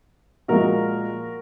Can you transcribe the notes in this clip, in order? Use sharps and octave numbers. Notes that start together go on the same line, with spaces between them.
A#2 F3 G#3 F#4 A#4